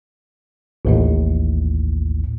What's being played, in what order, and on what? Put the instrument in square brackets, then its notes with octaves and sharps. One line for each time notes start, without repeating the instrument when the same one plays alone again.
[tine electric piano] A1 D#2 A2